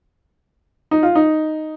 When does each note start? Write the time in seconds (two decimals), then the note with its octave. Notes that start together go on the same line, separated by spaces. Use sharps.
0.91 D#4
1.03 F4
1.15 D#4